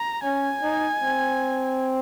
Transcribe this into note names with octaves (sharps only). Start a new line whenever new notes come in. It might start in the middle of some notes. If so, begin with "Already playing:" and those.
Already playing: A#5
C#4 G#5
D#4
C4